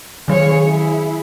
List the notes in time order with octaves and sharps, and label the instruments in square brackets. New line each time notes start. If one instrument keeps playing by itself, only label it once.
[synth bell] D#3 F#3 [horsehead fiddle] G#4 C#5
[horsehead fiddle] E4 G#4